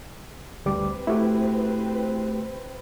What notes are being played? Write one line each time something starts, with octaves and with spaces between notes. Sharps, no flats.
D2 G3 C4 B4 D6
A3 E4 F#4 G4